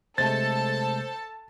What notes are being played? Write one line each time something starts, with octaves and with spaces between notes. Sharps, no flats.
C3 G#3 A3 A4 C5 A5 A6